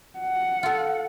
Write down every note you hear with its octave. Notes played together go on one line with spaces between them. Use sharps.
F#5
F4 A4